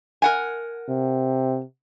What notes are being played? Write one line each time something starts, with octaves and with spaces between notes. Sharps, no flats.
A#4 F#5 G#5
C3